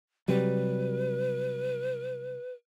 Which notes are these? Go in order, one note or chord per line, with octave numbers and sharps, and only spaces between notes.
C3 F#3 G3 B4